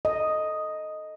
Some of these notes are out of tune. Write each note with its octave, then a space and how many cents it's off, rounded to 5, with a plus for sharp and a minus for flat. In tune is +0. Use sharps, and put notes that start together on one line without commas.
A4 +0 D#5 +0